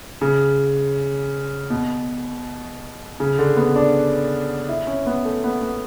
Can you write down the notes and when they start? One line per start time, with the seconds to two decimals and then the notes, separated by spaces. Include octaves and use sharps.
0.22 C#3
1.70 B2
3.20 C#3
3.39 D3
3.57 B3
3.76 D4
4.69 E4
4.87 C#4
5.06 B3
5.25 A3
5.44 B3
5.62 B3